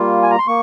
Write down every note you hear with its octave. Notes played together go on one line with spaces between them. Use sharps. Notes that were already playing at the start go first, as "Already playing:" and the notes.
Already playing: G3 A#3 F4
G#5
A#5
C6
A#3 C#6